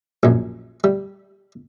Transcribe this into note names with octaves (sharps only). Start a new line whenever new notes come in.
A#1 F#2
G3